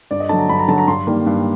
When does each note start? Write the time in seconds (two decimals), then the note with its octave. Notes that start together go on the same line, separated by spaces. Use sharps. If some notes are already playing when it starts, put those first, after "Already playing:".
0.11 G2 D5
0.20 D#5
0.29 D3 F#3 A5
0.39 A#5
0.49 G2 B5
0.59 A#5
0.68 D3 F#3 A5
0.78 A#5
0.87 G2 C6
1.07 D#3 G3 A#3
1.26 G2